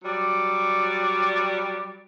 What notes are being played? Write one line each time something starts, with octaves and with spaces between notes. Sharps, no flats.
F#3 G3 D5